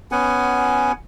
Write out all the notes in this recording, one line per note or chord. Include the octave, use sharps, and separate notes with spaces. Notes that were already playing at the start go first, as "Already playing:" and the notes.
B3 C#4 F#5 G#5